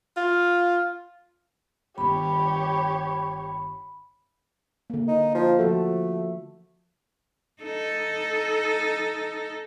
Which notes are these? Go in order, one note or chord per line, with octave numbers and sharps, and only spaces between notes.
F4
G1 D#3 G4 C#5 B5
D3 A#3
D#4
F3
F3 A3 F#4 A4
D#4 A4